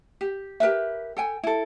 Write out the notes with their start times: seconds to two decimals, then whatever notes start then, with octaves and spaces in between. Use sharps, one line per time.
0.21 G4
0.60 G4 A#4 B4 E5
1.17 A4 G5 G#5
1.44 E4 A4